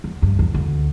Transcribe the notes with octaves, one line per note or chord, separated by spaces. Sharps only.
E2
G2
E2
D2